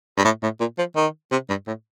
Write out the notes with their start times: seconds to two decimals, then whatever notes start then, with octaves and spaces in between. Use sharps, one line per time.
0.17 G2
0.25 A2
0.43 A2
0.60 A#2
0.78 F3
0.96 D#3
1.32 C3
1.49 G2
1.67 A2